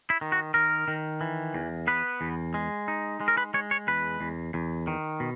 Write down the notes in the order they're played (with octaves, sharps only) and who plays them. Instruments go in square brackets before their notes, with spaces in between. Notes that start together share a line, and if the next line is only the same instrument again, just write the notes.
[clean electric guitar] E4
D#3
F#4
D#3 A#4
D#3
E3
E2
B3 B4
E2
G#3
D#4
G#3
A#4
B4
G#3 C#5
C#5
E2 B4
E2
E2
D#3
B2